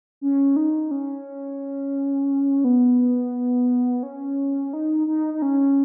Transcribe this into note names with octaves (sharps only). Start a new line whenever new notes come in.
C#4
D#4
C#4
B3
C#4
D#4
D#4
D#4
C#4